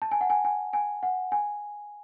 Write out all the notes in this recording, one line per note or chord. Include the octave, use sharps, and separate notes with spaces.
A5
G#5
F#5
G#5
G#5
G#5
F#5
G#5